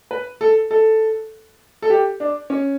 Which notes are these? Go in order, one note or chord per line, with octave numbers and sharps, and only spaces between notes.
B4
A4
A4
A4
G4
D4
C#4